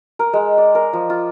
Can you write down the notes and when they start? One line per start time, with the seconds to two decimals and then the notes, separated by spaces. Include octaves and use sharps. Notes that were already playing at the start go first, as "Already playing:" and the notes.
0.19 A#4
0.33 G#3
0.58 D5
0.75 A#4
0.93 F3
1.10 F4